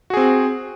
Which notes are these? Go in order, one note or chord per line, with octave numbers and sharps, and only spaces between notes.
C4 F#4 G#4